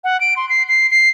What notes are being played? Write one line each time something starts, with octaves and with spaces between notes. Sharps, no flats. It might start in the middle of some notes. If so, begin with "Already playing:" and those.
F#5
D7
C6
C7
C7
C7